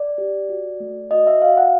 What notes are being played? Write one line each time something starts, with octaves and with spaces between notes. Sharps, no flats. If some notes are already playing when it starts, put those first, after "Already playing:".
Already playing: D5
G4
F#4
A3
F#4 D#5
E5
F#4 F5
F#5